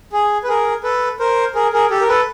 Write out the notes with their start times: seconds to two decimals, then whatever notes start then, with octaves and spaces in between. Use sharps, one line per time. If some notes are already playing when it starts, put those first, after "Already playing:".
0.13 G#4
0.44 B4
0.48 G#4 A#4
0.83 A4 B4
1.20 A#4 C5
1.55 G#4 A#4
1.73 G#4 A#4
1.90 G4 A4
2.01 A#4
2.08 A4 B4